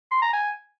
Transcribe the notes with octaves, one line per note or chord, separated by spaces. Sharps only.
C6
A#5
G#5